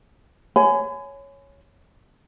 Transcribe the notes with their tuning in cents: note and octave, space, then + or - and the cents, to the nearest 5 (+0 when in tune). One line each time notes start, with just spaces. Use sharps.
C#5 +0 G#5 +15 B5 +40